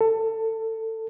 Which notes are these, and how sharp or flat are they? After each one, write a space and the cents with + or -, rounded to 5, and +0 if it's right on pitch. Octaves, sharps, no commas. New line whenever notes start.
A4 +20